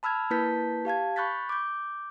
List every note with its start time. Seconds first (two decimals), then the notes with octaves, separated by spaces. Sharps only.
0.03 A5 B5 E6 F6 G#6
0.30 A#3 E4 B4 A5 G6 B6
0.85 G4 F5 A5 G#6
1.16 B5 C#6 F#6 G6 A6 B6
1.49 D6 G6